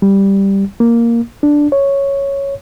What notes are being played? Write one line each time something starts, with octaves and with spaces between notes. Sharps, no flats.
G3
A#3
D4
C#5